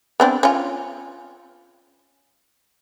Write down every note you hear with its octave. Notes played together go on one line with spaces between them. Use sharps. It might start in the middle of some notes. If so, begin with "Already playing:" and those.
B3 C4 D4
C#4 F4